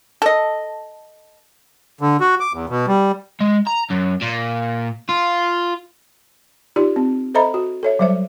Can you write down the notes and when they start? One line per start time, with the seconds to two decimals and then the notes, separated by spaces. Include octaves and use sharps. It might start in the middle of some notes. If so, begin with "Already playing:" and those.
0.22 A4 D#5
2.01 D3
2.21 F#4
2.40 D6
2.53 E2
2.69 B2
2.88 G3
3.41 G#3
3.67 A#5
3.90 F#2
4.21 A#2
5.09 F4
6.76 D#4 F4 G4 D5
6.96 C4
7.35 A4 C5 D#5 E5 A#5 B5
7.54 F#4
7.83 A4 C#5 E5
7.99 F#3 G3 C5 D5 E5